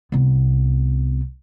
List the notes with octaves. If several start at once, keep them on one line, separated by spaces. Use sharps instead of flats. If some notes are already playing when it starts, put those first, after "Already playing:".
C2 B3